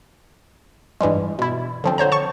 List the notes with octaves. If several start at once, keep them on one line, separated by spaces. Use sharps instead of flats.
G2 E3 G3 G#3
B2 E4
D3 F3 C4
D3 C5 C#5 A#5
A5 C#6